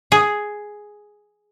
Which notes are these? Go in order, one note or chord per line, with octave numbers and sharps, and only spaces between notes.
G#4